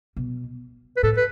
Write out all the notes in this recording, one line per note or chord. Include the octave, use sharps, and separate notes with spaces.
B2
B4
A2 A4
B4